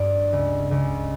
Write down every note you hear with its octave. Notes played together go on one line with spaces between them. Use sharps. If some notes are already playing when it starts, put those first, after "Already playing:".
Already playing: G2 D5
C#2
C#2